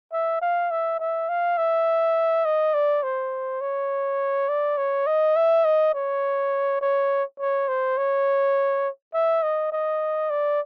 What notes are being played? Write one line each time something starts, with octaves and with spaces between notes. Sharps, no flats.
E5
F5
E5
E5
F5
E5
D#5
D5
C5
C#5
D5
C#5
D#5
E5
D#5
C#5
C#5
C#5
C5
C#5
E5
D#5
D#5
D5